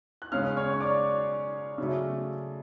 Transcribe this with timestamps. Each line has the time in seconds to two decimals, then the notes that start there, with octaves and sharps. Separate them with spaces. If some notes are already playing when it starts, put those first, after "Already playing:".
0.22 F#6
0.32 C#3 G#3 C#4 F5 F6
0.57 C#5 C#6
0.73 C#6
0.81 D5 D6
1.78 C#3 F#3 A3